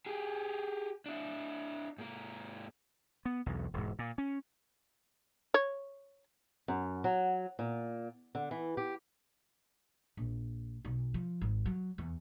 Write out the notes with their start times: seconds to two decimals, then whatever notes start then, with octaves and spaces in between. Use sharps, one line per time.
0.06 G4 G#4
1.06 D4 E4
1.98 G#2 A#3
3.25 B3
3.46 B1 E2
3.74 E1 G#2
3.99 A#2
4.18 C#4
5.54 C#5
6.68 F#2
7.04 F#3
7.59 A#2
8.35 D3
8.51 E3
8.77 G4
10.17 A#1
10.85 B1
11.14 F3
11.41 G#1
11.66 F#3
11.98 E2